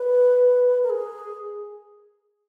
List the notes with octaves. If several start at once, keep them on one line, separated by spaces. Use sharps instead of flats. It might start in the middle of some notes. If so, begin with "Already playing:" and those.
Already playing: B4
A#4
G#4